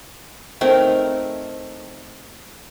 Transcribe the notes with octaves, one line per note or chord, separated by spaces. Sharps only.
A3 C4 D#4 A#4